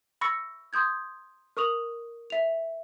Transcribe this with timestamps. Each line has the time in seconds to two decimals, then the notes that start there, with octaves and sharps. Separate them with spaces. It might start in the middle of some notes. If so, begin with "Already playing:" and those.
0.21 B5 C#6 E6 A#6 C#7
0.73 C6 D#6 G6 G#6
1.57 A#4 C#6 D#6 F7 F#7
2.30 E5 F7